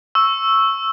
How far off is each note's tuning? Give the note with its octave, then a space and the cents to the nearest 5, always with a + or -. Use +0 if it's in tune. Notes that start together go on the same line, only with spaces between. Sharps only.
C#6 -10 E6 +0